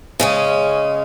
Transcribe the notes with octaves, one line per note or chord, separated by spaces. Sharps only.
C#3 G#3 C#4